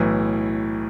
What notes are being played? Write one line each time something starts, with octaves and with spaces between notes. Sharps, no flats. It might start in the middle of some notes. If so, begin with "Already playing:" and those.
Already playing: B1 A2 E3